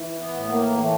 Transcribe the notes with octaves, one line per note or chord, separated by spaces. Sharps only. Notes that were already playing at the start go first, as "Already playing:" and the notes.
Already playing: E3
B3
A2
A#3
E3 A3